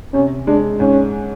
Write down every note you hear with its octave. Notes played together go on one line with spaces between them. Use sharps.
C3 C#4
G#3 D4
G#2 C#4